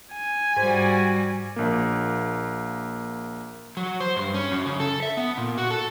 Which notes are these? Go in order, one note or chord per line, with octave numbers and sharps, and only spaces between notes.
G#5
G#2 G3 F#4 C5
A#1 A#3
F#3
C5
G2
C#4
F#2
C#3
A4
E5
B3
A#2
F#4
A4